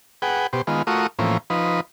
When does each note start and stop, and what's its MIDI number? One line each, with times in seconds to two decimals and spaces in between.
0.22 0.47 68
0.22 0.47 71
0.22 0.47 78
0.22 0.47 79
0.53 0.62 47
0.53 0.62 67
0.53 0.62 72
0.67 0.82 51
0.67 0.82 56
0.67 0.82 59
0.67 0.82 65
0.87 1.07 57
0.87 1.07 65
0.87 1.07 66
0.87 1.07 70
0.87 1.07 85
0.87 1.07 87
1.19 1.37 45
1.19 1.37 52
1.19 1.37 53
1.19 1.37 58
1.19 1.37 60
1.19 1.37 61
1.50 1.80 53
1.50 1.80 63
1.50 1.80 71